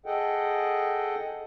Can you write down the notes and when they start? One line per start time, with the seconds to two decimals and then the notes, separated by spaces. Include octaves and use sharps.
0.06 G#4 A4 D#5 F#5 G5